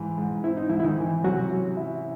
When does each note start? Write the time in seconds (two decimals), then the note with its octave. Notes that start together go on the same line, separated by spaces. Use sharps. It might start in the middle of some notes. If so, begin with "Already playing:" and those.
Already playing: G#2 E3
0.18 G#2
0.44 C4 E4
0.57 D#4
0.69 G#2 E3 E4
0.80 E4
0.84 D#3 D#4
0.98 E3
1.24 C3 F#3 F#4
1.51 C#4
1.77 E4